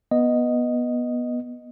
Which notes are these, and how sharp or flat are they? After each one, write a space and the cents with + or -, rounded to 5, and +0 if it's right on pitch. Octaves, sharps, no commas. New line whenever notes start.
B3 -15 D#5 -5